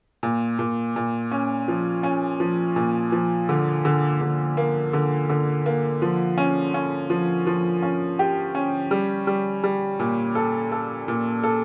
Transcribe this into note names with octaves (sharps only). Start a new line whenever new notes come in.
A#2
A#2
A#2
C#4
F3
C#4
F3
A#2
F3
D3
D3
D3
A#3
D3
D3
A#3
F3
C#4
C#4
F3
F3
C#4
G4
C#4
G3
G3
G3
A#2
A4
A4
A#2
A4